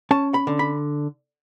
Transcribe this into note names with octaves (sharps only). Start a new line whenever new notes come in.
C#4 A5
B5
D3
B5